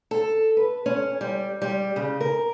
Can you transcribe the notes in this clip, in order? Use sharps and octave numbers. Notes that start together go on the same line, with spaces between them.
A4
B4
C#4
G3
G3
C#3
A#4